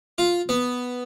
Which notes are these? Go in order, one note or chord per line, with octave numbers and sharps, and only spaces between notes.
F4
B3